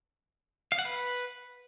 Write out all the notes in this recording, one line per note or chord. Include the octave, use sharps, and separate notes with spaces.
F5
F#5
B4